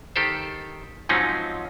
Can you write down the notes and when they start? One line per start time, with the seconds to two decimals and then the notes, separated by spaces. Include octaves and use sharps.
0.16 D#3 G4 A4 C5
1.09 G#2 F3 F#3 C4 C#4 D#4